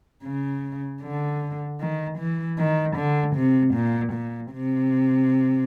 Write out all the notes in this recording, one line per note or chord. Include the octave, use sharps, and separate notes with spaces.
C#3
D3
D#3
E3
D#3
D3
C3
A#2
A#2
C3